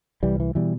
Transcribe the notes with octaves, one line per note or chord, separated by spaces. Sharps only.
C2 E3 G3
E3
B2 E3 G3